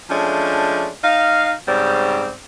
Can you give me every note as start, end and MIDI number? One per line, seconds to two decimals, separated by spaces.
0.10 0.89 53
0.10 0.89 56
0.10 0.89 57
0.10 0.89 61
0.10 0.89 62
1.04 1.53 63
1.04 1.53 77
1.68 2.31 44
1.68 2.31 49
1.68 2.31 55
1.68 2.31 60
1.68 2.31 74